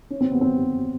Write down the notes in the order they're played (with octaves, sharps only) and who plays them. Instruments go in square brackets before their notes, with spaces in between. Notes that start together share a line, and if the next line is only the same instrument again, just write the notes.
[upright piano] C#4
C4
B3
C4